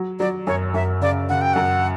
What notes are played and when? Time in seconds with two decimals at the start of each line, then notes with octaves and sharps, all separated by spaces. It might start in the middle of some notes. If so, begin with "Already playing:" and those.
Already playing: F#3
0.20 F#3 D5
0.47 F#2 C#5
0.74 F#2 E5
1.01 C#3 D5
1.29 C#3 F#5
1.41 G5
1.54 F#2 F#5